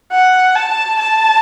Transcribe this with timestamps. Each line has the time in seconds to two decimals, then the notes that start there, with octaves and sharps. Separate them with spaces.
0.11 F#5
0.55 A5
0.98 A5